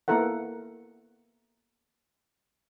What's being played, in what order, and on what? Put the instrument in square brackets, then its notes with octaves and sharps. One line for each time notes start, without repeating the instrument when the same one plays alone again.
[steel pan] A#3 B3 E4 A4 A#4 F#5